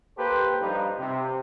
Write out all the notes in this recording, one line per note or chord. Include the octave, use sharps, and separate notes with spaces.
A#3 G4 A4 B4 C5
G2 F3 D#4 G4 B4
C3